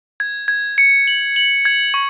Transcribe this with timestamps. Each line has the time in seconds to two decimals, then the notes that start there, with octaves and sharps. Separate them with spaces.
0.20 G#6
0.48 G#6
0.78 C#7
1.07 F#7
1.36 F#7
1.65 G#6
1.94 C#6